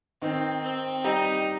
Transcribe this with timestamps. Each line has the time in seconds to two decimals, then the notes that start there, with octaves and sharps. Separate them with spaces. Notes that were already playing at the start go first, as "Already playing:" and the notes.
0.22 D#3 C4 D#4
0.64 C4
1.04 G3 D#4 G4